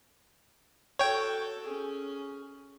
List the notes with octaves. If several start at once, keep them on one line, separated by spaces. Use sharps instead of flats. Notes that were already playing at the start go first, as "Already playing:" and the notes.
F#4 A4 C#5 G5
C#4 G#4